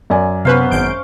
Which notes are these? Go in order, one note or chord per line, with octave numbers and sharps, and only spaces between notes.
F#2 D5 G#5
C3 B3 C#4 B4 C5 F5
G#1 G6 D7